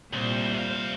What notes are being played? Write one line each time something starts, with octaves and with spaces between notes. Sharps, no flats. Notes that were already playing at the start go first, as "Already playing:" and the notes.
C2 A#2 G3 C5
C3 F5